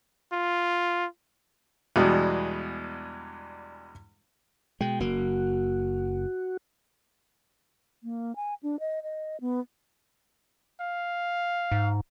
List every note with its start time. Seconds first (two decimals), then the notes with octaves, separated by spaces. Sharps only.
0.33 F4
1.96 E2 B2 G3 G#3 D4
4.81 B2 G#3 G5
5.00 F#1 A#3 F#4
8.03 A#3
8.36 G#5
8.63 D4
8.80 D#5
9.03 D#5
9.41 B3
10.81 F5
11.72 G#2